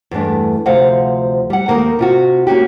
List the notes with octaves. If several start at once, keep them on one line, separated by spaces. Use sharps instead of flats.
E2 G2 A3 D4
D2 C3 F3 C5 F5 F#5
G3 F#5
D#2 A#3 D#4 F4 A#4
C3 F4 F#4
A#3 C#4 F#4 G4